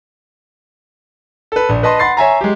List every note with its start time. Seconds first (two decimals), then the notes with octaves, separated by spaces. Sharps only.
1.52 A4 B4
1.69 A#1
1.83 B4 D#5 A5 C6
1.99 F#5 B5 C6 A6 C7
2.17 C#5 E5 G#5 A#5
2.41 G#3 G4